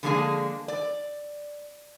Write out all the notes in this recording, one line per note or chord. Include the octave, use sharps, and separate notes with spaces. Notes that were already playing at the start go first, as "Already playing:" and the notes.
D3 F3 G#3 A#3 D4 G#4
D5